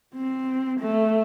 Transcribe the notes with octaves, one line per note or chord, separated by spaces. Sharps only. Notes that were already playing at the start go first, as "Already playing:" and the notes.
C4
A3